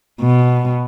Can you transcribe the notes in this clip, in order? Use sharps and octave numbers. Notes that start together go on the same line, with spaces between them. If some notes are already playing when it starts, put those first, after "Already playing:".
B2